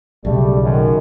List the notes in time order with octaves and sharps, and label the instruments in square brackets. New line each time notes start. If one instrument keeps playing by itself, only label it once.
[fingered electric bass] B1 C#3 [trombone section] G3 A3
[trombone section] F#2 D#3